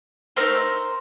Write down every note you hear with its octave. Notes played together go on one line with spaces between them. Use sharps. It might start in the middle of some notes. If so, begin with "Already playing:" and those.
A3 C4 D#4 A#4 C5